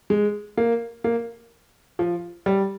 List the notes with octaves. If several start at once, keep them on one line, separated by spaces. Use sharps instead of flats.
G#3
A#3
A#3
F3
G3